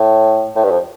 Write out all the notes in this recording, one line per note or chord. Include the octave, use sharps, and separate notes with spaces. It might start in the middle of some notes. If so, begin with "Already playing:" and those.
Already playing: A2
A2
G2
F2